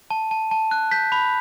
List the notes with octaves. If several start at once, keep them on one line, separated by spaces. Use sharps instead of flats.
A5
A5
A5
F#6
G6 B6
B5